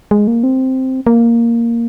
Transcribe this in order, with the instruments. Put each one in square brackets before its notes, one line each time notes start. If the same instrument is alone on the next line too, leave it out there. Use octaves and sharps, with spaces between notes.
[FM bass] G#3
A#3
C4
A#3